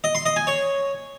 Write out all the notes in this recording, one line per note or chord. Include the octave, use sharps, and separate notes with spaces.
D#5
C6
D#5
G#5
C#5